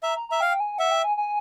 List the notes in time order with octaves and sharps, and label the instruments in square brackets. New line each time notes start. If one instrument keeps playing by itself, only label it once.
[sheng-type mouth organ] E5 [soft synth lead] A#5
[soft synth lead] A#5
[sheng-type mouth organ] E5 [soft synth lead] A#5
[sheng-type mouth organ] F5 [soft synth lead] G5
[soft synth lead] G#5
[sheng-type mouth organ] E5 [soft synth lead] F#5
[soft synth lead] G5
G#5
G#5